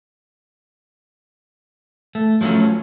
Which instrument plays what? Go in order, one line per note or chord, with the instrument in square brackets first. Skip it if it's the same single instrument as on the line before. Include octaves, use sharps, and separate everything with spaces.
[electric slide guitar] A3
F3 F#3 G#3 A3 C#4